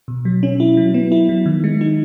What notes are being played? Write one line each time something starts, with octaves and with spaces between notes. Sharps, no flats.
B2
F#3
C#4
E4
F#3
B3
E4
F#3
D#3
G#3
D#4